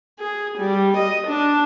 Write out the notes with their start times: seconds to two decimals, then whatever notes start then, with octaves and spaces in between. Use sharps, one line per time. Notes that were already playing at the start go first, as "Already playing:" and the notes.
0.19 G#4
0.59 G3
0.97 D#5
1.27 D4